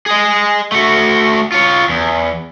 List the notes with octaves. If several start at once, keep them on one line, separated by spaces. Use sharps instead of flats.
G#4 D#5
A3 F#4
F4 C#5
E2